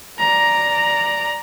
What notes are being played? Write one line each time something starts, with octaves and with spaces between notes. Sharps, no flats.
D5 A#5